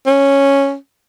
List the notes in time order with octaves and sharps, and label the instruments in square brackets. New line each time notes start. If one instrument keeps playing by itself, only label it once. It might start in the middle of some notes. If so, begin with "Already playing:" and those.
[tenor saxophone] C#4